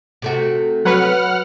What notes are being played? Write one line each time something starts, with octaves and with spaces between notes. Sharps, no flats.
C3 A3 F#4
F#3 B4 F#5 F6